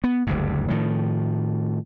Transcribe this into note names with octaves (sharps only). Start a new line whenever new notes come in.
B3
F#1 D2 G2
A2 D#3 F3